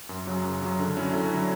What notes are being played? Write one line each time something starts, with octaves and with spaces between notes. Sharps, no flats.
F#2
C#3 F#3
F#2
C#3 F#3
D3
F#3 C#4 E4
D3
F#3 C#4 E4